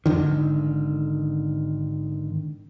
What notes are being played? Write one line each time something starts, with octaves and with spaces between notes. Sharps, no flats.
G#1 B2 D3 D#3